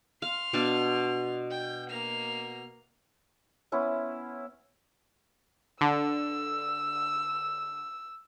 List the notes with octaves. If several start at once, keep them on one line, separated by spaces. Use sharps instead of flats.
F5 C6 F6
B2 D4 F5
G5
A#3 F6
B3 C#4 E4 C5
D3 E6